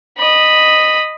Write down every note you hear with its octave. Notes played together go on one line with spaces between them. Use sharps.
D#5 B5